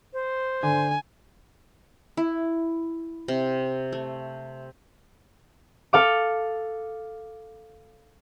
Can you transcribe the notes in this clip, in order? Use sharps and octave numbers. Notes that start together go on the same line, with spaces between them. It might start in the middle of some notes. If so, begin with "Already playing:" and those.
C5
D3 G#5
E4
C3
A3
A4 F5 D6